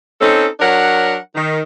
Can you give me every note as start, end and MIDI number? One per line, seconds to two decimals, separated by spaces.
0.21 0.46 60
0.21 0.46 61
0.21 0.46 63
0.21 0.46 69
0.60 1.15 54
0.60 1.15 62
0.60 1.15 70
0.60 1.15 73
0.60 1.15 78
1.35 1.60 51